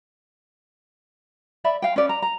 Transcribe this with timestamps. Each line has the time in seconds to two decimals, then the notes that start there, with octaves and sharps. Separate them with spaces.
1.64 D5 E5 B5
1.82 F5 G5
1.96 C#4 B4 D5
2.09 A#5
2.22 A#5